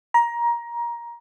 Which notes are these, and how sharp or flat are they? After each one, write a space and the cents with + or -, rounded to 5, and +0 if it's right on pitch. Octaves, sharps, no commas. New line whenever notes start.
A#5 +20